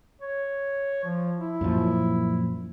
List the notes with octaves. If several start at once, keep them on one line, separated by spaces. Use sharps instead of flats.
C#5
F3
E4
F#2 A#2 F3